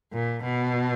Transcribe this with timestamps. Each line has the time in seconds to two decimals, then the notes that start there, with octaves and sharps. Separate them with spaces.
0.13 A#2
0.43 B2